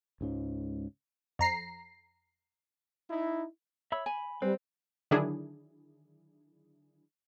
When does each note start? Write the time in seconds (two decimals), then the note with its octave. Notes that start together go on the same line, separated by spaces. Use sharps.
0.21 C#2 G#2 C#3
1.39 F2 A#5 C7
3.10 D#4 E4
3.92 C#5 E5 B5 E6
4.06 G#5 B5
4.42 G3 C4 B4
5.11 D3 D#3 F#3 D4 E4 G#4